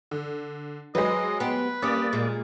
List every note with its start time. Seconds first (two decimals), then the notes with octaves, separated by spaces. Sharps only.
0.11 D3
0.95 F#3 G#3 B4 D#5
1.40 B3 G4 B4
1.82 G3 A#3 C#4 D5 D#6
2.13 A#2 G#3